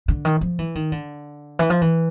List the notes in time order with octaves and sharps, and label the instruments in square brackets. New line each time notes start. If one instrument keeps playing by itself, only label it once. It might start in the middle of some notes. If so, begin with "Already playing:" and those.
[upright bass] D3
D#3
F3
E3
D#3
D3
E3
F3
E3